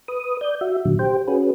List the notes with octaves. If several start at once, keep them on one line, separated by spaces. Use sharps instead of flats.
B4 D#6
D5 G6
F#4 E5
A#2 D3 F#3
G4 C5 G5
C#4 F#4 G#4 B4